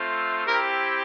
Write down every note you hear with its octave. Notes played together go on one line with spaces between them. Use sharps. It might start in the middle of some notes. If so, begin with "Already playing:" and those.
Already playing: A3 C4 F4
C4 E4 G4 A#4